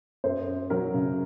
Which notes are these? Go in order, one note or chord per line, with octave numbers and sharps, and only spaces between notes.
F#2 C5
F#2
F#3 A#4
C#3